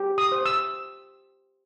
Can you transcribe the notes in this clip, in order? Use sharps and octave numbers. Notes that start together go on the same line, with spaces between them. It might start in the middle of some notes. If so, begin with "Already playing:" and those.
Already playing: G4
D#6
C5
E6